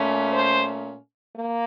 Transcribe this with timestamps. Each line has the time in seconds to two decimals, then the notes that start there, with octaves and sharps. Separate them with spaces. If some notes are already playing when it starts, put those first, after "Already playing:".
Already playing: A#2 A3 C#4
0.33 C5
1.36 A#3